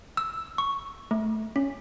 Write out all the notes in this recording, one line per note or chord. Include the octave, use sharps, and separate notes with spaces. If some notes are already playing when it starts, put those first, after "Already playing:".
E6
C#6
A3
C#4